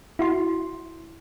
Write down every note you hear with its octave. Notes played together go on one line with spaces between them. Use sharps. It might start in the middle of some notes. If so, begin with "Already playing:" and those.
E4 F#4 C6